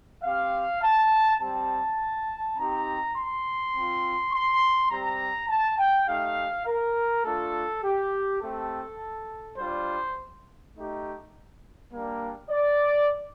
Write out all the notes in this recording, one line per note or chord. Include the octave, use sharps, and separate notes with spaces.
C4 G4 F5
A5
G3 C4 G4 A5
C4 D#4 G4 A#5
C6
C4 F4
C6
G3 C4 G4 A#5
A5
G5
A3 D#4 G4 F5
A#4
A3 D4 F4 A4
G4
A3 C4 G4 A4
G3 D4 F4 C5
A3 D#4 G4
G3 A#3 D4
D5